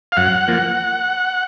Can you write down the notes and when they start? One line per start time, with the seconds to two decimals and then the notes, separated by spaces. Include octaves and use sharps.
0.12 F5
0.17 F#2 F#5
0.48 F3 A#3